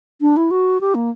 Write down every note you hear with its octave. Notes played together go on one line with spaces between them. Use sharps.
D4
E4
F#4
G4
A#3